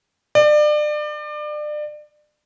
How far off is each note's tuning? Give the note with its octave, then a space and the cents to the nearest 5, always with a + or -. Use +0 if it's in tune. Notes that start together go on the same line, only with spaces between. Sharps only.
D5 +30